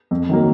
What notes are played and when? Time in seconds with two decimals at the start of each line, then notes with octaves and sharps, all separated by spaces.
0.11 F2
0.29 D#3 F#3 A#3